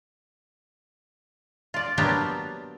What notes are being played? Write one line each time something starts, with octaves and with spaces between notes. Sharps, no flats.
F4 D5
F#3 A#3 B3 D4 F4 G4